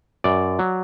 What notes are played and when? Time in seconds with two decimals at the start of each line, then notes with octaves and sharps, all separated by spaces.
0.24 F#2 D5
0.59 F#3